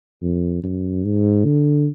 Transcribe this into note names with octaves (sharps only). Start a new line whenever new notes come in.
F2
F#2
G#2
D3